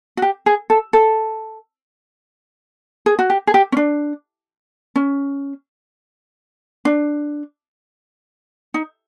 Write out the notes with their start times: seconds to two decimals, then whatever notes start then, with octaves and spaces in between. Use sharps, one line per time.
0.17 F#4
0.22 G4
0.46 G#4
0.70 A4
0.93 A4
3.06 G#4
3.19 F#4
3.30 G4
3.47 G#4
3.54 G4
3.72 C#4
3.77 D4
4.96 C#4
6.85 D4
8.74 D#4